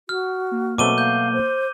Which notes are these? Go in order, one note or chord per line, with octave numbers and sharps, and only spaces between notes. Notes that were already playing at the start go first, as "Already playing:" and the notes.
F#4 F6
A#3
B2 F#3 A3 C4 D6 D#7 G7
F5 G6
C5